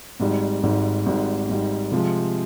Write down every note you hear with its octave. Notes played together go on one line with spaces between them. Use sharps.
G#1 G#2 G3
G#1 G#2 G3
G#1 G#2 G3
G#1 G#2 G3
C3 F3 G#3